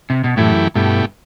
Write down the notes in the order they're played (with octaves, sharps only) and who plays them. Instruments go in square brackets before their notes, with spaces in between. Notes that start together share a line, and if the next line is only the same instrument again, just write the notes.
[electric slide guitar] C3
B2
[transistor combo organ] F#2 E3 A3 E4 G4 [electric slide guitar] A2
[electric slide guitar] G2 [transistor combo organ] B2 A3 E4 G4